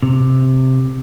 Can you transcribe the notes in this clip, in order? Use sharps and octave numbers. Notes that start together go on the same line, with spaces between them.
C3